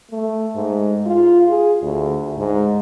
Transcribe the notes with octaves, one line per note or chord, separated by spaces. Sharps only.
A3
G#2
F4
G#4
D2
G#2